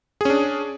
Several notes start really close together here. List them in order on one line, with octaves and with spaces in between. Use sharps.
G#4 C#4 D4